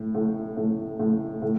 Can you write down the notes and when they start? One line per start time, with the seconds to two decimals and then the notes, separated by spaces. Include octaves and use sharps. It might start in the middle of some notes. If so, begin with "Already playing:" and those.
Already playing: A2
0.15 A2
0.57 A2
0.99 A2
1.42 A2